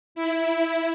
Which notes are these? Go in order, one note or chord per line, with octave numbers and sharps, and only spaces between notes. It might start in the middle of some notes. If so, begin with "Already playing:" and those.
E4